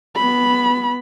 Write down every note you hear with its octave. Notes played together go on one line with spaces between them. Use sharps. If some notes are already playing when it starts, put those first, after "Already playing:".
B3 B5